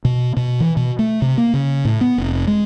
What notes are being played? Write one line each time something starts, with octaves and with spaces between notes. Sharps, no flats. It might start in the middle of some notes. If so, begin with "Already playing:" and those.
B2
B2
E3
B2
A3
C3
A#3
C#3
A2
B3
F1
G#3